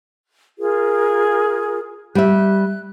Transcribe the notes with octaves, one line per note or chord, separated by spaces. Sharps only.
F4 G#4 A#4
G3 E5 F#6